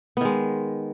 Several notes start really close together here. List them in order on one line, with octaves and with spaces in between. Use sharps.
B3 D#3 G#3